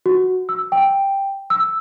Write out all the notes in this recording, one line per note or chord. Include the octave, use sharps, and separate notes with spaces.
F#4
E6
G5
E6